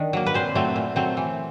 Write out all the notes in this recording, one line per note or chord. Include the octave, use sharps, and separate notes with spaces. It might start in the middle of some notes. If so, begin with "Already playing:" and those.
Already playing: D#3 D4 D5
F#3 A#3
B4
A#2 C4 C5
F#3 A3 C4
A#2
F#3 A3 C4
E3